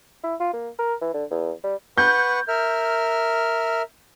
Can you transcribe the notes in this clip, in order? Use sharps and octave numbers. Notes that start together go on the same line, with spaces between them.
E4
F4
A#3
A#4
E3
D3
E2
G3
B4 F#5 C#6 G6
A#4 E5 F6